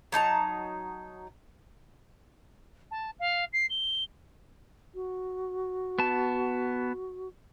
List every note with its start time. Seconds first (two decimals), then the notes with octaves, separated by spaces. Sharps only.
0.12 F#3 D#4 A5 A#5
2.91 A5
3.19 F5
3.53 C7
3.70 G7
4.95 F#4
5.99 B3 A5